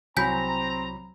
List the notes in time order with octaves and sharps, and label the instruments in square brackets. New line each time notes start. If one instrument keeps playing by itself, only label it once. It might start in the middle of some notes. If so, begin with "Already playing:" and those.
[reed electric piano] C2 F#3 B5 [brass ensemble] C4 A#5 [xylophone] G#5 G6 B6